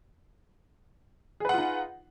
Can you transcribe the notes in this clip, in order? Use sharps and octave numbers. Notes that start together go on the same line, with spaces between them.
D#4 F4 G#4 B4 F#5